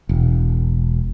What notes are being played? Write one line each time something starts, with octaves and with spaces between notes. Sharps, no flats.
E1